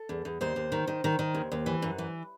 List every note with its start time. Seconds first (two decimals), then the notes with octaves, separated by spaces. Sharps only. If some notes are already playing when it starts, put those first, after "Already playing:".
Already playing: A4
0.09 E2
0.25 E2
0.41 D#2 C5
0.56 D#2
0.72 D#3
0.87 D#3
1.04 D#3
1.19 D#3
1.35 D#2
1.52 D#2
1.66 E3
1.82 F#2
1.98 E3